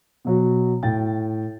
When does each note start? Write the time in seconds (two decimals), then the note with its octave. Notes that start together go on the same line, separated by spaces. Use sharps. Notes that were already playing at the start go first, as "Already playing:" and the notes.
0.25 B2 F#3 F#4
0.83 A2 G5 A6